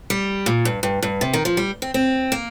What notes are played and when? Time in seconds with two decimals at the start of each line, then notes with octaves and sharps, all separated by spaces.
0.10 G3
0.46 A#2
0.65 G2
0.83 G2
1.03 G2
1.21 C3
1.33 D#3
1.45 F3
1.57 G3
1.82 C4
1.94 C4
2.32 A#3